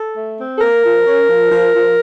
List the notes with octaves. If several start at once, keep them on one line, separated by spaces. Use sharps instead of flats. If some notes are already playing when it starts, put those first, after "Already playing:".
Already playing: A4
A3
C4
A4
A#3 A#4
F3
C#4
F3
F3
F3